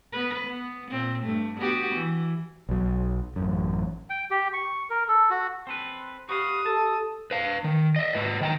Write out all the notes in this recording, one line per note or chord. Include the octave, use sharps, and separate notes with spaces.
B3 B4
B3
A#2 C4
G2 A3
B3 F#4 G4
E3
B1 F#3
A1 F#2
G5
G4
C#6
A#4
A4
F#4
C4 A4 B4
F#4 G4 B4 F5 D#6
A4 A5
B4 F5
D#3
D#5 E5
G#2 B4 D#5
D#3 G5 A#5